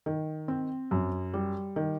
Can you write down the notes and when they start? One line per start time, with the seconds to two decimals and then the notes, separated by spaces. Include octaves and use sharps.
0.06 D#3
0.48 C4
0.91 F#2
1.34 G3
1.76 D#3